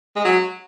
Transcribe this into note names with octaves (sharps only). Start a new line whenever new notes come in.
G#3
F#3